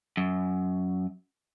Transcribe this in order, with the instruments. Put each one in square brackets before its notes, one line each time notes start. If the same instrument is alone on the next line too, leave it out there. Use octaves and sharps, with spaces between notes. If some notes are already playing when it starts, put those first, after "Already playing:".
[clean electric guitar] F#2